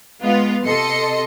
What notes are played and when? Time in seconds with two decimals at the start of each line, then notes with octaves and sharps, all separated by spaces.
0.22 G#3 B3 F4
0.65 C3 A4 D#5 C6 C#7